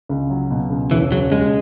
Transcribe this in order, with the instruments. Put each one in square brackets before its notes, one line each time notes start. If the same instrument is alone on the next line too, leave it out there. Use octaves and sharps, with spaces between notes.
[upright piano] C#2
F#3
B2
C#2
[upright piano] E1 [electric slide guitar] E3
[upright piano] C#3 [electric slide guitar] F#3
[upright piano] D#2 [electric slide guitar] G#3